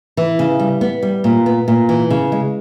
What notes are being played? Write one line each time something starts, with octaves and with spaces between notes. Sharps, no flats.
E3
C#3
G3
B3
G3
A#2
B3
A#2
E3
C#3
G#3